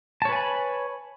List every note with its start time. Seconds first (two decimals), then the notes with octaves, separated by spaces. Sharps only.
0.22 A5
0.25 C#5
0.29 B4
0.32 G#5
0.36 B5